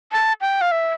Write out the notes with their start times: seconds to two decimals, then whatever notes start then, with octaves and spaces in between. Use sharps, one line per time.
0.12 A5
0.41 G5
0.61 F5
0.71 E5